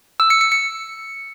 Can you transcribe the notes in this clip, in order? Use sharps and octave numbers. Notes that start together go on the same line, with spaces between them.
E6
C#7
C#7
C#7